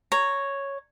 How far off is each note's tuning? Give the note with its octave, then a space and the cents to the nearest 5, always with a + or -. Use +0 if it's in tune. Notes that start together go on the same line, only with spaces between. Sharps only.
C#5 +0 A#5 -10